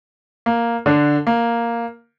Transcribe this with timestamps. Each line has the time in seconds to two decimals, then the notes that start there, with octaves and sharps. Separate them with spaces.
0.46 A#3
0.86 D3 D4
1.27 A#3